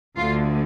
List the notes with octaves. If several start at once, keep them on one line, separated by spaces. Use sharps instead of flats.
D2 D3 F4